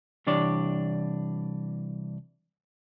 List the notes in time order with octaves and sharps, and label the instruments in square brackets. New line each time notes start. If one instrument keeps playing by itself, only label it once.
[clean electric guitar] C2 E3 D4 G4 C#5 D5